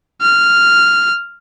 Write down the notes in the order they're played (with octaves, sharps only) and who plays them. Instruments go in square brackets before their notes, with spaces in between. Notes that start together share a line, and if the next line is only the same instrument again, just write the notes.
[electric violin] F6